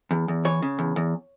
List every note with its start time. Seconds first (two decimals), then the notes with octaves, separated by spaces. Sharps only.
0.11 E2
0.28 E2
0.45 E3 C#5
0.62 C#3
0.79 E2
0.96 E2